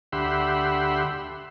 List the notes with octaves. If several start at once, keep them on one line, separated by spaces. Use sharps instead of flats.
D2 G4 E5 F#5 B5 C6